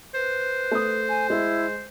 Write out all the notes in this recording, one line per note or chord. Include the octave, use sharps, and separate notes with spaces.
B4 C5
A3 D#6
G#5
G#3 E4